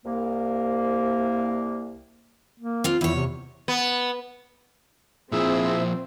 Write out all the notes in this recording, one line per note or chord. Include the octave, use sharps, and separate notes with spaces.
C2 A#3
A#3
C4 F4
E2 E4 C#5
C3
B3
A#2 F3 C4 E4 G#4 E5 E6